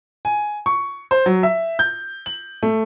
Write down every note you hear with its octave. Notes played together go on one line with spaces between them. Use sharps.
G#5
C#6
C5
F#3
E5
G6
F#7
A3